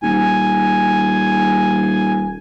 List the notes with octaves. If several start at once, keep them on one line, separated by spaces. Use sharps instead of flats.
D#1 G#5